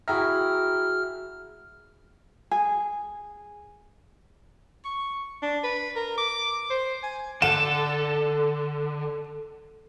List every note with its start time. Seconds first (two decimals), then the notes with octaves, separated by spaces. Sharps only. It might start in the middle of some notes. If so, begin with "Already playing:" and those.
0.08 E4 F#4 G#4 E5 G5 A#5 F6
2.51 G#4
4.85 C#6
5.42 D4
5.63 B4
5.96 A#4
6.18 D6
6.70 C5
7.03 G#5
7.42 D3 A4 F#5 E7